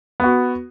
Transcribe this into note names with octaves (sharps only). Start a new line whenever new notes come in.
B3 F#4